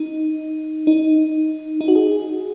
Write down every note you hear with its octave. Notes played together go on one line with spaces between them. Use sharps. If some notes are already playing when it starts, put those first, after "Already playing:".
Already playing: D#4
D#4
D#4
F#4
G#4